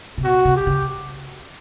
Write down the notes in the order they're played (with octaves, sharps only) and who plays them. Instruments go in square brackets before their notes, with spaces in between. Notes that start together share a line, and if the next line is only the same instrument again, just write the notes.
[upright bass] C3
[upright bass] B2 [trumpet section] F#4
[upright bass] C3
[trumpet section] G4
[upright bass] C#3